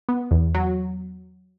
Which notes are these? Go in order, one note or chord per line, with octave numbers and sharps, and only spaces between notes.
B3
E2
F#3